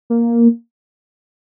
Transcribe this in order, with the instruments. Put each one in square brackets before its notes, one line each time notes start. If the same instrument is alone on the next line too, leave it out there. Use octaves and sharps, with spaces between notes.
[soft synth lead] A#3